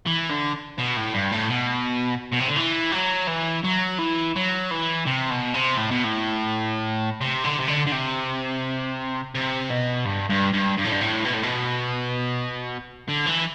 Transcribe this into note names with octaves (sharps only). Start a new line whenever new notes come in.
E3
D3
B2
A2
G2
A2
B2
B2
C3
D3
E3
F#3
E3
F#3
E3
F#3
E3
C3
B2
C3
A2
B2
A2
C3
D3
C3
D3
D3
C3
C3
B2
G2
G2
G2
G2
A2
G2
A2
B2
A2
B2
D3
E3